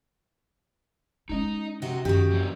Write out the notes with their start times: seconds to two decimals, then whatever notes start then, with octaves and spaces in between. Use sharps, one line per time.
1.29 G#3 C#4 D#4 D#5
1.82 C3 D#4 F#4 D#5
2.05 F#2 D#3 F#4 G4
2.31 E3 A#3 C4